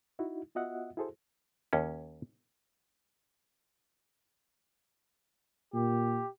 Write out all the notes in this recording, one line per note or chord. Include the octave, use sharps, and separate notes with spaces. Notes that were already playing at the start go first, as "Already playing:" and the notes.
D#4 E4 F#4
B3 F4 F#4 D#5 E5 F#5
E4 F#4 G#4 A4 C5
D#2 C#4
A#2 G4